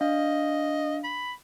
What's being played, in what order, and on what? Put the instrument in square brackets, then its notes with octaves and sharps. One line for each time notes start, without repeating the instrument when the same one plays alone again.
[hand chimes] D4 F5 [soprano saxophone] D#5
[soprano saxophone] B5